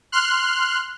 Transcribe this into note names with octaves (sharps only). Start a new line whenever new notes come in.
C6 F6 F#6